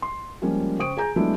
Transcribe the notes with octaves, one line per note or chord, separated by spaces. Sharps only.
C6
F3 G3 G#3 A#3 C#4
C#3 C5 G5 C#6 D#6 D7
G#4 G#5 A#5 G6
F#3 G#3 A3 B3 D4 E4